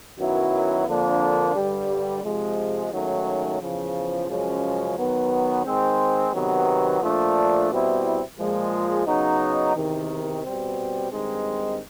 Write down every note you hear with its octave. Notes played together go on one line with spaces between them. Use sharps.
F#2 D#3 F#3 B3 E4
F2 D3 F3 A#3 D4
G2 D3 G3
C3 F3 G#3
G#2 D#3 F#3 A3 C#4
E2 C#3 F3
F#2 C#3 F3 G#3 C#4
D#3 F#3 B3
D#3 G#3 C4
C3 D#3 F#3 B3
A#2 F3 A3 D4
B2 G3 C4 E4
A#2 F3 G#3
C#3 F#3 B3 D#4
E2 C3 D#3
B2 G3 C4
G2 D#3 G#3 C4 D#4